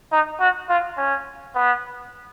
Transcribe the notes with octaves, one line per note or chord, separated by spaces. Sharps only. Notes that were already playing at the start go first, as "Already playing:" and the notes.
D#4
F#4
F4
C#4
B3